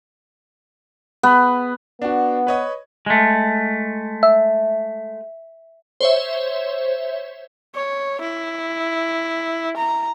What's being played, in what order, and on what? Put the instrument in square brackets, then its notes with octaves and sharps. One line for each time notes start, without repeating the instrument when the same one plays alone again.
[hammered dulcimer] B3
[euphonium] B3 [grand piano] D4 F#4
[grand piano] B4 C#5 D#5
[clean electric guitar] G#3 A3
[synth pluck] E5
[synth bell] C5 C#5 E5
[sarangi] C#5
E4
A#5